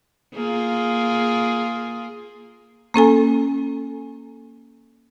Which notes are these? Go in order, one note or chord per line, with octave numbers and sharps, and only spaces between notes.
A#3 F4 G#4
A#3 C#4 A4 G#5